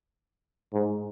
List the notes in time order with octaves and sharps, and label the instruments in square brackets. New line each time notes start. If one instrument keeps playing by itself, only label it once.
[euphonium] G#2